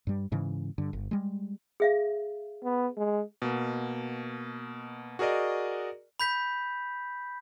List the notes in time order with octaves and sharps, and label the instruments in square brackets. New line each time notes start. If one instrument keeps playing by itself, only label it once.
[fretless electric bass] G2 G3
G#2 C#3 E3
G2 D3
G1
G3 G#3
[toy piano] G#4 E5 F5
[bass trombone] B3
G#3
[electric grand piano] B2 A#3
F#4 G#4 A#4 D5 D#5
[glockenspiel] B5 G6 B6